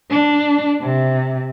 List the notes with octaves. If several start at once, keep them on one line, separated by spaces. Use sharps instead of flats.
D4
C3